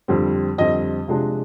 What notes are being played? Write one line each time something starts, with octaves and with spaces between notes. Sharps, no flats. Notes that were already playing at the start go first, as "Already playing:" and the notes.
F2 D3 G3 C4
F2 D3 G3 C4 D#5
C3 F3 G#3 D4